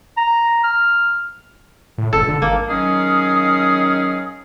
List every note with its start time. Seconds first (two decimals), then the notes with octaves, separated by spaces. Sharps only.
0.17 A#5
0.64 F6
1.98 A2
2.13 F1 A4
2.28 D3
2.42 G#1 A#3
2.70 D#3 F#3 C#4 G#4 F5 D#6